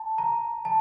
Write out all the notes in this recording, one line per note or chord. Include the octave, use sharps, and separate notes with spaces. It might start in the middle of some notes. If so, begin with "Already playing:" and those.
Already playing: A5
A#5
A5